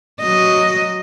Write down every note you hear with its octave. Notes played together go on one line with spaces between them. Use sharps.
F#3 D#5